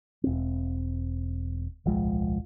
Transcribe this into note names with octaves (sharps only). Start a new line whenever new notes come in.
E1 C4
D1 B1 F3 G#3